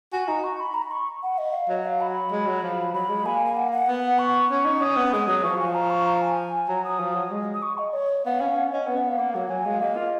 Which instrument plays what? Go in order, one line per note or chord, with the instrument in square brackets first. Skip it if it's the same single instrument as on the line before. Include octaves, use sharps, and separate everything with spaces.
[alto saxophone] F#4 [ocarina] G#5
[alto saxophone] D#4 [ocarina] A#5
[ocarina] C#6
B5
A#5
B5
C#6
F#5
D#5
F5
[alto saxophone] F#3 [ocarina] D#5
[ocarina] F5
B5
[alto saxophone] G#3
F#3
F3
[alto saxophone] F#3 [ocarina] B5
[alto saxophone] G#3
[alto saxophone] A#3 [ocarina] G#5
[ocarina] G#5
F#5
F#5
[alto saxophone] B3
[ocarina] C#6
[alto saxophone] C#4
D#4
[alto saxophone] C#4 [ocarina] D#6
[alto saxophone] B3
[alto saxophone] G#3 [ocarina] D#6
[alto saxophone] F#3 [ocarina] D#6
[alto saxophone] F3 [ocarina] C#6
[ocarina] G#5
A#5
C#6
A#5
G#5
[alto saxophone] F#3 [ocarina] A#5
[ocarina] D#6
[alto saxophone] F3
F#3
G#3
[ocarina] D#6
C#6
D#5
C#5
[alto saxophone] B3 [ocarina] F5
[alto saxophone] C#4
[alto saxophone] C#4 [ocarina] F#5
[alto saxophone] C#4 [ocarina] D#5
[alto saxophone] B3 [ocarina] B4
[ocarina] F#5
F5
[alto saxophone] A#3 [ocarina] F#5
[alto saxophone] F#3 [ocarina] F#5
[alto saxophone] F#3 [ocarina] G#5
[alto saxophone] G#3 [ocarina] F5
[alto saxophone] A#3 [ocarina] D#5
[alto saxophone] F4